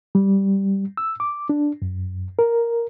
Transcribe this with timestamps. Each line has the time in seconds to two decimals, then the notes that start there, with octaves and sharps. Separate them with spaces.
0.15 G3
0.97 E6
1.20 D6
1.49 D4
1.82 F#2
2.39 A#4